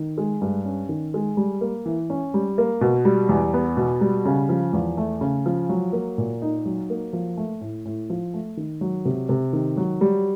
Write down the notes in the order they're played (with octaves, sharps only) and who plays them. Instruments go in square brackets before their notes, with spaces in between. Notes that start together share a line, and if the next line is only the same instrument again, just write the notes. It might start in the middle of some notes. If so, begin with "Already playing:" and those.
Already playing: [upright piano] D#3
G#3
G2
C#4
D#3
G#3
G3
A#3
E3
C#4
G3
A#3
B2
G3
E2
B3
B2
G3
C#3
F3
E2
A3
C#3
F3
F#3
A#3
A#2
D#4
F#3
A#3
F3
A3
A2
A2
F3
A3
D#3
F#3
C3
C3
D#3
F#3
G3